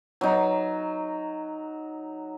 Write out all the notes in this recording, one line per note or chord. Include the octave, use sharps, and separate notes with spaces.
F#3 D#4